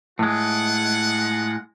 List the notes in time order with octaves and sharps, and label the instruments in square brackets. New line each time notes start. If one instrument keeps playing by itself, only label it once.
[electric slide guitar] A2 G#3 [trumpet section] F4 F#5